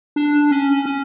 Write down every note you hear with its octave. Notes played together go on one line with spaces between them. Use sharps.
D4
C#4
C#4